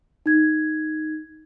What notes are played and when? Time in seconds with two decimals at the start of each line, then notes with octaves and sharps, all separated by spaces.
0.26 D#4 G#6